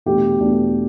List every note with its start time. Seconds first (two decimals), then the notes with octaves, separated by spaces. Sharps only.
0.06 E2 B2 A3 D4 G4
0.39 E2 B2 A3 D4